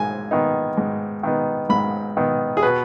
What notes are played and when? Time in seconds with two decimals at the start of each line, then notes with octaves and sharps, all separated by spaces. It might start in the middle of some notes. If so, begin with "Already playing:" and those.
Already playing: G#2 G#5
0.31 D#3 B3 D#4
0.78 G#2
1.23 D#3 B3 D#4
1.69 G#2 B5
2.17 D#3 B3 D#4
2.57 G#4
2.63 B2 B4